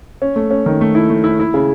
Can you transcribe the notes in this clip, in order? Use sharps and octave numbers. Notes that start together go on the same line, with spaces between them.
C#4
A3
C#4
D#3
A3
E4
A3
E4
E4
C#3